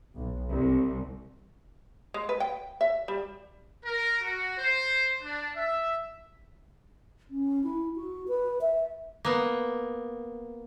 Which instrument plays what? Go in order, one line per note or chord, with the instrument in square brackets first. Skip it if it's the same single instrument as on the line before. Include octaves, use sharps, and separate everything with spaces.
[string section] B1
C2
[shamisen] G#3
B4
G5
E5
G3
[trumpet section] A#4
F#4
C5
D4
E5
[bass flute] C#4
E4
F#4
B4
E5
[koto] A#3 B3